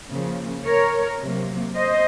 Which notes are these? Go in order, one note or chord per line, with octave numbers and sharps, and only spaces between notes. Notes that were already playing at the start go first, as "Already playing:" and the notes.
C#3 F3 A#3
A#4 C#5
C3 F#3 A#3
C5 D#5